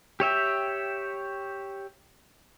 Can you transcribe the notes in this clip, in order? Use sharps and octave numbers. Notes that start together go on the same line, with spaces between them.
G4 C#5 E5 G5